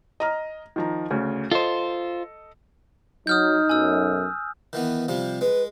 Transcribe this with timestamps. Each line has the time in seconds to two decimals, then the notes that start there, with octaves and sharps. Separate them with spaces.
0.20 D#5 A#5 F6
0.76 D#3 F3 A#5
1.11 D2 C#3
1.51 F4 A4 C5 D#5
3.27 F#3 D#4 D#6 F6 G6
3.69 B1 F#2 G#5 E6
4.73 D#3 E3 B3
5.08 C3 F3 G3
5.41 G#3 B4